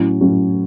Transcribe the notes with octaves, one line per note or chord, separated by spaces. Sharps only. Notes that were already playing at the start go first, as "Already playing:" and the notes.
Already playing: A2 F#3 C#4 E4
A2 F#3 C#4 E4